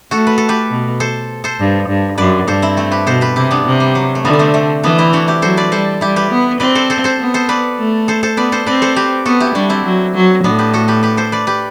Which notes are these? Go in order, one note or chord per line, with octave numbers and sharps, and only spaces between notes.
A3 F#4 A4
B4
A4
G4 B4
B2
A4 C5
A4 C5
G2
G2
F#2 B4 D5
G2 A4 C5
C4 E4
A3 C4
G4 B4
B2 A4 C5
G4 B4
C3 E4 G4
B3 D4
C3
G3
F#3
A3
D3 G3 B3
D4
A3 C4
A3 C4
E3 B3 D4
C4 E4
D4 F#4
E4 G4
F#3 A4 C5
B4 D5
G3 A4 C5
G3 E4 G4
G4 B4
B3
C4 B4 D5
A4 C5
A4 C5
A4 C5
B3
A4 C5
B4 D5
A3
A4 C5
A4 C5
B3 B4 D5
A4 C5
C4 B4 D5
A4 C5
G4 B4
B3 F#4 A4
E4 G4
G3 D4 F#4
C4 E4
F#3
F#3
A2 B3 D4
G4 B4
F#4 A4
G4 B4
G4 B4
A4 C5
B4 D5
G4 B4